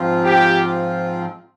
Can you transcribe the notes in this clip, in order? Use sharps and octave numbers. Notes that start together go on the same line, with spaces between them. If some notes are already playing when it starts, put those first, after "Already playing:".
Already playing: G#2 F3 C4 F4
G4